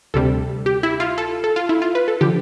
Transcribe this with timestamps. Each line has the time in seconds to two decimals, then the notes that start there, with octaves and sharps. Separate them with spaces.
0.14 D2 C3 G3 A4
0.66 G4
0.83 E4
1.00 F4
1.18 A4
1.44 A4
1.56 F4
1.69 E4
1.82 F4
1.95 B4
2.08 A4
2.21 D3 F3 G4